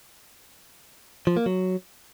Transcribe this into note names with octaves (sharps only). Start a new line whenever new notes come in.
F3
A#3
F#3